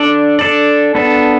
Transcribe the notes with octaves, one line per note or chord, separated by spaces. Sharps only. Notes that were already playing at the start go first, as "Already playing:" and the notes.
Already playing: D4 A4 D5
D4 A4 D5
B3 D4 A4